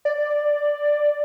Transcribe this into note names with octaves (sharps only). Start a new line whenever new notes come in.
D5